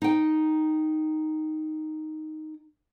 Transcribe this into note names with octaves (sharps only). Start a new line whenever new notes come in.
D#4 G5